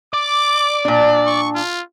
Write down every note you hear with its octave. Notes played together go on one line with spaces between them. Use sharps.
D5 D6
A#2 D4
C#6
F4